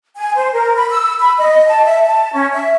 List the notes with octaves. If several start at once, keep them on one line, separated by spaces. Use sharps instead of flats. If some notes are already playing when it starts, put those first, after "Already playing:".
G#5
C5
A#4
B5
E6
B5
D#5
A5
E5
A5
C#4
E5